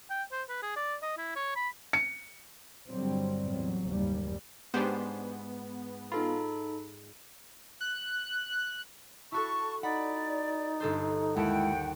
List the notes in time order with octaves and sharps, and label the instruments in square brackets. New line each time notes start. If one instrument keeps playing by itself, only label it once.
[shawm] G5
C5
B4
G#4
D5
D#5
E4
C#5
B5
[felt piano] C#7
[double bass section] G2 D3 F#3 G3 C4
E2 A2 F#3
F#1 D#2 G#2 G3
[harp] G#2 [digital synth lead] B3 [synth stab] D4 G4 C5
[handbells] D#4 A4 B5 [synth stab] F4
[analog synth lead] F#6
[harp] E4 F#4 A4 [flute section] A5 C#6
[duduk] D#4 [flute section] D5 [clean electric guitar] F#5 [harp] B5
[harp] G1 A4 C5
[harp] D#2 [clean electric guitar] G#3 A5 [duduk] E4 [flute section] F#5 G5